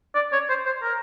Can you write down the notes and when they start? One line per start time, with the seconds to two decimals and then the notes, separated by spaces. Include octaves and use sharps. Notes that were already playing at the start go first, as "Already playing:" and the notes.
0.15 D5
0.33 C#5
0.49 C5
0.66 C5
0.83 A#4